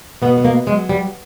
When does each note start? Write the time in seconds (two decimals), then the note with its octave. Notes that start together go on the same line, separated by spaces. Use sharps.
0.22 B2 B3
0.38 B3
0.45 A#3
0.67 F#3 G#3
0.89 G3